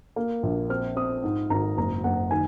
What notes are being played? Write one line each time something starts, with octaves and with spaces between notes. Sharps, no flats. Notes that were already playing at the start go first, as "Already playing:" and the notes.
A#3
A#1
C4 F6
C4 D#6
G#2
G#1 A#5
F#1 A#5
F#1 F#5
D#3 G#5